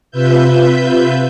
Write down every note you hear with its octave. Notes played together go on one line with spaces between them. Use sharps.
C3 F4 B4 E5 G6